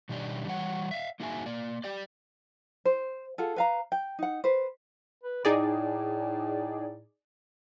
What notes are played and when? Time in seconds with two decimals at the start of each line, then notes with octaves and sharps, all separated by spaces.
0.09 B2 D#3 G3 D4 G4 D5
0.47 E3 G3 C#5 F#5
0.91 E5 F5
1.20 A#3 D#4 F#4 G#4 E5 G#5
1.46 A#3 D5
1.84 G4 D5
2.85 C5
3.38 F4 G#4 A4 F#5
3.56 B4 F5 A#5
3.92 G5
4.19 D#4 F#5
4.44 B4 C5
5.23 B4
5.45 A2 D#4 G#4 D5